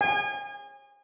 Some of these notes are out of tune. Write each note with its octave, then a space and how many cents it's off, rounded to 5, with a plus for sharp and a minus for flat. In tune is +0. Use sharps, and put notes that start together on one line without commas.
G#5 -35